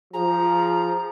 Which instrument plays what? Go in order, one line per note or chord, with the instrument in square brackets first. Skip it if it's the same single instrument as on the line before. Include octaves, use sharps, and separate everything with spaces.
[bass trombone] F3 [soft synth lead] G#4 [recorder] A#5